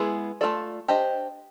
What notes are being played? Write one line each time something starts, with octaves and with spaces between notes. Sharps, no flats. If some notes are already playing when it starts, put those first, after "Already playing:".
Already playing: G#3 B3 E4 G#4
A3 C#4 F4 A4 D5
D4 G4 C5 D#5